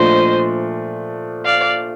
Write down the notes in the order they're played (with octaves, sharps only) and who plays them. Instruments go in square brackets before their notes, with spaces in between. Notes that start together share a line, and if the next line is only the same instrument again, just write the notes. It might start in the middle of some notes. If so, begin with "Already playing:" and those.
Already playing: [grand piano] A#2 F3 A3 D4 F4 [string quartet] C5 D#5
[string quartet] D5 F5